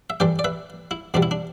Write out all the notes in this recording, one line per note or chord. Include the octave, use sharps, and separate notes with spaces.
E5
G2 E3 A3 D5 G5
D5
B4 E5
E4
E2 B2 G3 D4
E4
D4